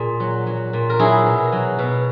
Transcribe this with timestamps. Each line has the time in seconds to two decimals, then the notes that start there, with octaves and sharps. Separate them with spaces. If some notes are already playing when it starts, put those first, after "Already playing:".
Already playing: A#2 G#4
0.20 F#3
0.46 F#3
0.73 A#2
0.90 A#4
0.99 F#3 E4 G#4
1.26 B2
1.52 F#3
1.79 B2